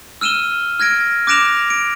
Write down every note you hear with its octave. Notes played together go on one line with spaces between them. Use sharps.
E6 F6 D#7 E7 G7
F6 G#6 A#6 D7
D6 F#6 A#6 D7 E7 F7
D7